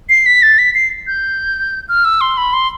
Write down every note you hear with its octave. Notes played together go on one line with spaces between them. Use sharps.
C7
B6
A6
B6
C7
G6
F6
E6
C6
B5
C6